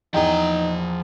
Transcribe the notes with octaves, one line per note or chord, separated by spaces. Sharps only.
E2 F3 D#4 D#5 G5 A#5